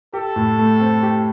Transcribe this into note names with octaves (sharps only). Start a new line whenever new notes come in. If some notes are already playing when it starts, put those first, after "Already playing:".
G4 A4
A2
A3
C4
G4